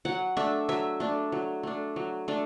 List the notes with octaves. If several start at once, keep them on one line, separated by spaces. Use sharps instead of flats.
F#3 F#5
A3 D4 E5
F#3 E5
A3 D4
F#3
A3 D4
F#3
A3 D4